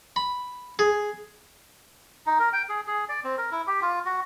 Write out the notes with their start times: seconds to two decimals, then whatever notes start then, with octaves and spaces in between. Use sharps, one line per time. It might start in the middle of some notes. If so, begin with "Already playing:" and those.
0.16 B5
0.79 G#4
2.27 D#4
2.39 A#4
2.53 G5
2.69 G#4
2.87 G#4
3.09 D5
3.24 C4
3.38 A#4
3.51 E4
3.67 G4
3.82 F4
4.05 F#4